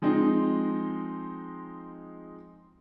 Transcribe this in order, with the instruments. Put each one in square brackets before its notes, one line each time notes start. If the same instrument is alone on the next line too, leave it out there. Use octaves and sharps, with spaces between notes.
[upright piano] F3 G#3 C4 D#4